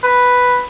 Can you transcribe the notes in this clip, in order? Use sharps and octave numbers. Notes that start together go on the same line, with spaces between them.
B4